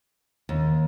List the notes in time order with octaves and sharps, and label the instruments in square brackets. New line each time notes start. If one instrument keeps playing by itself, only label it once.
[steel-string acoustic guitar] D#2